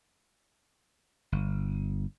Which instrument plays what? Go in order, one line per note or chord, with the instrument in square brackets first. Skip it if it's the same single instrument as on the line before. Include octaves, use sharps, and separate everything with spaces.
[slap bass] G1